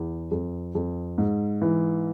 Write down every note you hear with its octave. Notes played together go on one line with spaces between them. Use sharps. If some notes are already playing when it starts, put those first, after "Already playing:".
Already playing: E2
F2
F2
G#2
E3